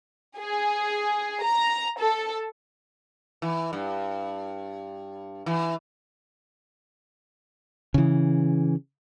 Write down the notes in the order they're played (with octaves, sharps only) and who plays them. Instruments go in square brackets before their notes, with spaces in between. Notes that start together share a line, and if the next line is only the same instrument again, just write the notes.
[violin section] G#4
A#5
A4
[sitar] E3
G2
E3
[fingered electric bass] C#3 E3